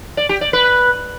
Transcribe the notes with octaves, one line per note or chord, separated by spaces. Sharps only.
D5
G4
D5
B4